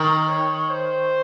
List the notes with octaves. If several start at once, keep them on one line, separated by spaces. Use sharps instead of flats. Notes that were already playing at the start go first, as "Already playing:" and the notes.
Already playing: D#3 A#4
C#5
C5